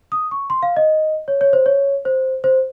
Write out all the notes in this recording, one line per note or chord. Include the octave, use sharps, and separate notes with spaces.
D#6
C#6
C6
F5
D#5
C#5
C#5
C5
C#5
C5
C5